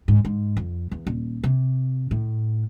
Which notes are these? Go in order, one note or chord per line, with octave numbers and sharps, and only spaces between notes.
G#2
G#2
F2
E2
D#1
C3
A2